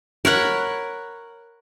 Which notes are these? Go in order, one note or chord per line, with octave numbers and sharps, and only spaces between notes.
A#4 C#5 F#5 B5